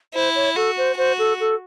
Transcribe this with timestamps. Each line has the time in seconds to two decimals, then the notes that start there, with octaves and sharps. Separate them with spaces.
0.14 E4 C5
0.35 C#5
0.56 F#4 A4
0.78 C5
0.98 F#4 C5
1.19 A4
1.40 A4